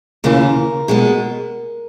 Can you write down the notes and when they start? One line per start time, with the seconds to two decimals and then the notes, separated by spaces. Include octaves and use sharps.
0.24 D#2 C#3 E3 A#4
0.88 B2 G#3 B3